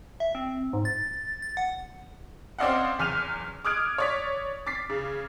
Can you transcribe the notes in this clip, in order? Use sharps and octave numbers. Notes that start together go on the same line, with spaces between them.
E5
C4
G#2
A6
A6
F#5
C4 C#4 D5 D#5 F5 F#5
F#1 E2 F6 D#7 F7
D6 D#6 F6 F#6 G#6 D7
C#5 D5 B6
D6 A6 B6 C7
C#3